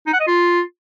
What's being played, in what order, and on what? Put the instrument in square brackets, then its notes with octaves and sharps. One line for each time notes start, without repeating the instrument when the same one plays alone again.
[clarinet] D#4
F#5
D#5
F4